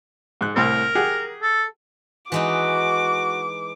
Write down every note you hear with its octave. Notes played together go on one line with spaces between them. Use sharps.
G#2 F#6
C2 A2 C4 A#4
G4 G#4 F#5
A4
E3 G#3 D#4 F#4 D6